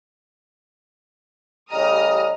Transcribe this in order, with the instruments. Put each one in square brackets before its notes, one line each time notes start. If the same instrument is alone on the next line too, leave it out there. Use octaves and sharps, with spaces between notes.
[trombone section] A1 C#3 G3 [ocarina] D#5 [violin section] A#5 D#6 F6